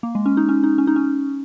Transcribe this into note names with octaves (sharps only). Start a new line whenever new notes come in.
A#3
G#3
C#4
D#4
C#4
D#4
C#4
D#4
C#4